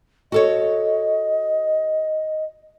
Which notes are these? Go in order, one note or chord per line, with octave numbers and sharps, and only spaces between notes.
F#4 A4 C#5 D#5